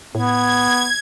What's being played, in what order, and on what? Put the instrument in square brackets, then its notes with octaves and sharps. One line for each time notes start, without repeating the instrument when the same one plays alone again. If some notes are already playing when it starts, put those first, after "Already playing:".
[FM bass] A2 [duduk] B3 [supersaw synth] G#6